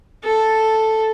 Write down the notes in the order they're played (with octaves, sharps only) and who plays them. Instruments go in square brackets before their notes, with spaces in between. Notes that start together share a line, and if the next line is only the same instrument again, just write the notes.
[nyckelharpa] A4